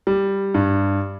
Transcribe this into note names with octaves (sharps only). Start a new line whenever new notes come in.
G3
G2